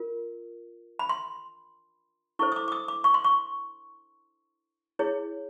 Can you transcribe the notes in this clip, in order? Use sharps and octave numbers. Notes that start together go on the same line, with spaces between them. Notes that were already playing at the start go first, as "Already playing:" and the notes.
Already playing: F4 A#4
B5
C6
E4 A4 C5 C#6
D#6
D6
D6
D#6
D6
C#6
C6
C#6
E4 G#4 C#5